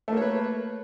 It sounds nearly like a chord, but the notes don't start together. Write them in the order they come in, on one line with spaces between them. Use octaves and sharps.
A3 A#3 C#5 B4